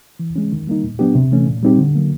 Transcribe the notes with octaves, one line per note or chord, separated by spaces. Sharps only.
E3
G#3 C#4
D#3
G3 A#3 D#4
A#2
F#3 B3 D4 G4
C3
E3 A3 C#4
A#2
G3 C4 D#4 G4
D3
F#3 A#3